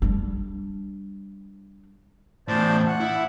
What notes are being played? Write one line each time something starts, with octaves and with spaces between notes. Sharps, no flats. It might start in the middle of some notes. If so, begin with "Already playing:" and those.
G3 D4
E2 A2 C5 D5 A5
F#5
E4